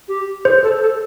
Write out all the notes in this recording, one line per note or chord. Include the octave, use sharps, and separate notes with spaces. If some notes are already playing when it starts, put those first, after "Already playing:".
G4
G#4 C5
A4
A4